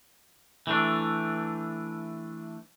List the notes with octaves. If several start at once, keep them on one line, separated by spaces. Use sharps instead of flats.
E3 A3 D4